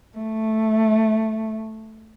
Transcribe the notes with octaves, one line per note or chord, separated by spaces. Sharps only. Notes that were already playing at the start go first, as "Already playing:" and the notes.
A3